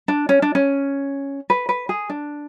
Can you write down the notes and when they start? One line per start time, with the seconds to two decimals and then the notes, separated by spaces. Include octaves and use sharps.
0.08 D4
0.29 C#4
0.42 D4
0.55 C#4
1.50 B4
1.69 B4
1.89 G#4
2.10 D4